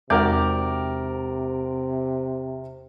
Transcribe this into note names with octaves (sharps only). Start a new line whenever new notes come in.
E2 C3 G#3 F#4 G4 A#4 D5 G6